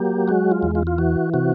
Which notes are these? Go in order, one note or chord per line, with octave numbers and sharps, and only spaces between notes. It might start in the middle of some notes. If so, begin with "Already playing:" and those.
Already playing: F#3 A#3 G4
G#3 F#4
F4
E2
F4
F4
E3 F#4
C3 F#4